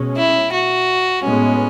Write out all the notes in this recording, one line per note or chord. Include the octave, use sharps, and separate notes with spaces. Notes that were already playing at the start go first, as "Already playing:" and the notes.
Already playing: B2 G#3 C#4
E4
F#4
A2 G#3 B3 C#4